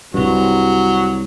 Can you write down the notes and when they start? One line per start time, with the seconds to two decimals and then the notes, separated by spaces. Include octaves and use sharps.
0.14 C2 G2 F#3